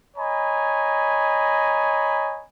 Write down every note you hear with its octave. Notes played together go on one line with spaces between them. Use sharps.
C#5 D#5 G#5 A#5 B5